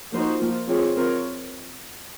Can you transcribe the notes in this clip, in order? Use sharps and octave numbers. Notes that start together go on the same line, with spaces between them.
F3 A#3 D#4 F#4 C5
F3 A#3 F4
F3 C4 F4 G#4 C#5
C4 F4 A#4 C#5